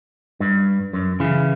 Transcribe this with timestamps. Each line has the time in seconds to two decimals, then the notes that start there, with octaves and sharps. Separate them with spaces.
0.40 G2
0.93 F#2
1.20 C#3 E3